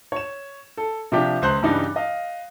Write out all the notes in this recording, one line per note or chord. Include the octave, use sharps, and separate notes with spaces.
C#5 E7
A4
C3 F3 D4 G4
C#2 C5 F#6
G2 C#3 E3 G3 D4 D#4
D#5 F5